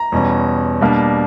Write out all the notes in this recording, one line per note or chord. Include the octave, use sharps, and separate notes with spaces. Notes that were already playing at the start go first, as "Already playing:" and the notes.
Already playing: A#5
E2 B2 G3 C#4
B2 G3 A#3 D4